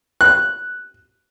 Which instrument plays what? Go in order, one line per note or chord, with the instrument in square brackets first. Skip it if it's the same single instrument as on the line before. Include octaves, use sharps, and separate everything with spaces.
[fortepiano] F#6